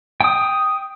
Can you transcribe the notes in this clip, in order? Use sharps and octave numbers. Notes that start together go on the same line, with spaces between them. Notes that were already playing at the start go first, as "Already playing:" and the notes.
G5 D#6